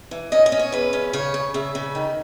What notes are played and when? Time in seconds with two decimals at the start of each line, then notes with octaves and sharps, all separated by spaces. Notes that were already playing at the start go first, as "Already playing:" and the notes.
0.11 E3
0.32 C#4 D#5
0.46 D#5
0.52 C#4
0.59 C#5
0.72 E2 B4
0.93 C#4
1.13 C#3 C#5
1.34 C#3
1.54 C#3 E5
1.75 C#3
1.95 D#3